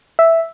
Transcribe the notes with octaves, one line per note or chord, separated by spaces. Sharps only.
E5